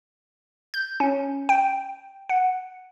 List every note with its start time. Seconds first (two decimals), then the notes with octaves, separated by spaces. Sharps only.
0.74 G6
1.00 C#4
1.49 G5
2.29 F#5